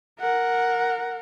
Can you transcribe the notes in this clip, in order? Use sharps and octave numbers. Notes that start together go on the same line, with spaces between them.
A#4 F#5